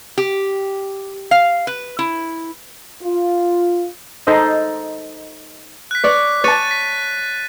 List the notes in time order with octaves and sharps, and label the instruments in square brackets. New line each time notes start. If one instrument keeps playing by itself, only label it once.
[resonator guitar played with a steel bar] G4
F5
B4
E4
[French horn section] F4
[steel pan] D#4 A4 C5 D#5
[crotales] F#6 B6
[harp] C#5 D5
[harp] C#5 A5 [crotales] F#6 A6 D#7
[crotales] B6